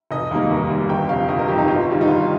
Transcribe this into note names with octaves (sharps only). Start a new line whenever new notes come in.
F1 D#5
D#2 D#3 G3 A#3
F1
D#2 D#3 G3 A#3
G1 G5
F2 C3 F5
G1 D#5
A#4
F2 C3 G4
D#4
G1 F4
G2 D#3 G3
D#4
G1 F4